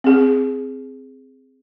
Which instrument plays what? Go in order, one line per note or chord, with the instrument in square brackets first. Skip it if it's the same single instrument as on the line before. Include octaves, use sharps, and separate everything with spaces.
[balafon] C4 G#4